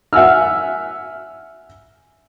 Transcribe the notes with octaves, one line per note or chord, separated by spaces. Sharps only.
E5 F#5 G#5 E6 F6